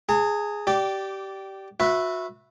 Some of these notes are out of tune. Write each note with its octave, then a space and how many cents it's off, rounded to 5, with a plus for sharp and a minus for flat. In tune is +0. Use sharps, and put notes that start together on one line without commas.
G#4 +0 A#5 -45
G4 -20 D5 +0
F#4 -30 B4 +0 E5 +0